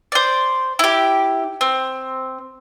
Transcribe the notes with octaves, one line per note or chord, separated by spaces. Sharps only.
C5 D5
E4 G4
C4